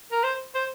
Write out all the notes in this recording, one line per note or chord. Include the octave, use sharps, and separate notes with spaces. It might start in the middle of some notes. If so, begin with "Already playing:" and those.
A#4
C5
C5